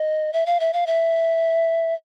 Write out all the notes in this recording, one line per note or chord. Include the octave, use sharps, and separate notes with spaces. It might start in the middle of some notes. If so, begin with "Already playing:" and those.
Already playing: D#5
E5
F5
E5
F5
E5